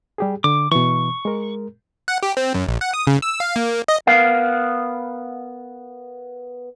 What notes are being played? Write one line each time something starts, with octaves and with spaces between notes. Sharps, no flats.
G3 G4 G#4
D3 D6
B2 E3 C#6
G#3 A#4
F#5
G4
C4
F#2
A#1
F#5
D#6
C#3
E6
F5
A#3
D#5
B3 A#4 F5